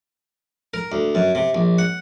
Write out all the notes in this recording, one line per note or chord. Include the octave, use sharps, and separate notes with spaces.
A#4
D2
F#2
C3
A#1
F#5